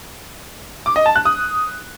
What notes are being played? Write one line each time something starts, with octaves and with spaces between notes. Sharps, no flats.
D6
D#5
A5
F#6
D#6